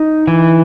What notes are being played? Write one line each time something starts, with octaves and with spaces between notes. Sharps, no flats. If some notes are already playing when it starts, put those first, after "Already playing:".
Already playing: D#4
E3